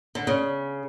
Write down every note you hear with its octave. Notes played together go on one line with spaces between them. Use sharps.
D3
C#3